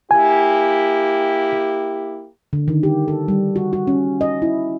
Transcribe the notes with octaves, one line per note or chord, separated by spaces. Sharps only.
A#3 E4 G4 G#5
D3
D#3
G4
A4
G3
F#4
F#4
C#4
D#5
E4